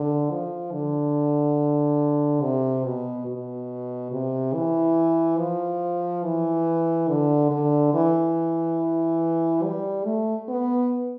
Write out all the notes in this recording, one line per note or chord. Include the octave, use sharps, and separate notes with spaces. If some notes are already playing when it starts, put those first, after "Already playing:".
Already playing: D3
F3
D3
C3
B2
B2
C3
E3
F3
E3
D3
D3
E3
G3
A3
B3